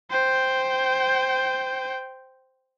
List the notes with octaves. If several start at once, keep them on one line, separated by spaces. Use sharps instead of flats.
C5 G5